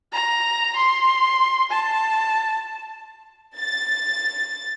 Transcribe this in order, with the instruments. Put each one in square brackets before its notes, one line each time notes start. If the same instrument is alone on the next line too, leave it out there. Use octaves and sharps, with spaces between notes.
[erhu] A#5
C6
A5
[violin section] A6